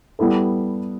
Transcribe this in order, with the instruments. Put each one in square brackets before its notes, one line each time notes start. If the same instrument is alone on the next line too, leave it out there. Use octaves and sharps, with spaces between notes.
[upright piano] G3 B3 E4 A4